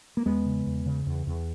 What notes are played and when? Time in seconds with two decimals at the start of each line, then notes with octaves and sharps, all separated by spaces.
0.17 A#3
0.26 E2 G#3 B3
0.46 C#3
0.66 E2
0.86 C#3
1.07 E2
1.27 E2